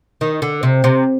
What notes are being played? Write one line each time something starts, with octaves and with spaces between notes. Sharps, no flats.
D#3
D3
C3
C3